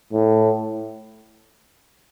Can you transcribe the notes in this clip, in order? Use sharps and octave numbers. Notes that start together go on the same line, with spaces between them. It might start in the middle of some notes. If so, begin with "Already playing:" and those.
A2